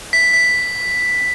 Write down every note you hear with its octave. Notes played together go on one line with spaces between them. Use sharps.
B6
B6